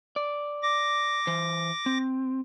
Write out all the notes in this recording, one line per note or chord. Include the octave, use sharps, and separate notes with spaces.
D5
D6 A#6
E3 C5
C4